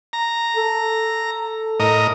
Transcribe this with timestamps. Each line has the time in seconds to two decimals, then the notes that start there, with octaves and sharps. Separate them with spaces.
0.13 A#5
0.55 A4
1.80 A2 A#4 D#5